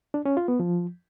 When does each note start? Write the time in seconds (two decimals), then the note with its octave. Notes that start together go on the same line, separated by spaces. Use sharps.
0.14 D4
0.25 C#4
0.37 F4
0.48 B3
0.60 F3